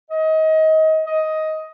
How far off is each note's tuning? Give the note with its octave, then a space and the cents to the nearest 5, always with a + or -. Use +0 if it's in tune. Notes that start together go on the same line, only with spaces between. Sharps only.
D#5 +25
D#5 +10